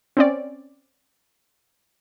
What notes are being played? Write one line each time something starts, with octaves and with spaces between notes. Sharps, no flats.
C4 C#4 D5